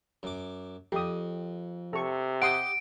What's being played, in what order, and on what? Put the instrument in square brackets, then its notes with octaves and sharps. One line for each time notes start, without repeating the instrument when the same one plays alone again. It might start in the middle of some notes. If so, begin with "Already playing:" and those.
[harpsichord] F#2 D6
[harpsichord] F2 [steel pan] G4 D#6
[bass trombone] C3 [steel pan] A4 C#6
[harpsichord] G4 D#5 G5 [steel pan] F#5 C6 D#6 [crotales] D7